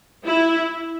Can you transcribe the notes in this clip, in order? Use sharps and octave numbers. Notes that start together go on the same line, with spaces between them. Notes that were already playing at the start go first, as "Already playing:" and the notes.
E4